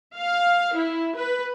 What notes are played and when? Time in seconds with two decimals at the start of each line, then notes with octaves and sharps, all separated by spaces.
0.16 F5
0.76 E4
1.16 B4